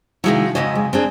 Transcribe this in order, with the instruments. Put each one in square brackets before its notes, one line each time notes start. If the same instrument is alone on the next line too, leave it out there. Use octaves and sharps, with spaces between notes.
[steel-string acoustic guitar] C3 F3 F#3 [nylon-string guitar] D#3 G#3 E4
[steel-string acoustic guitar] F2 G#2 C#3 [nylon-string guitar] D#5
[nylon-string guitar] G#3
[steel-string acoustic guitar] F#2 [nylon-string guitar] C4 D4 G#4